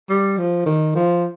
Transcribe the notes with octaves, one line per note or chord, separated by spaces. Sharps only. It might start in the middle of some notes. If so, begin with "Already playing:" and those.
G3
F3
D#3
F3